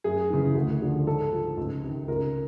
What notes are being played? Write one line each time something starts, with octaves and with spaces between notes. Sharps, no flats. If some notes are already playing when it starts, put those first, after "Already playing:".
F#2 G#4
C#3 E3
D2
D3 F3
G#2 A4
F3
C#2
C3 D#3
C#2 A#4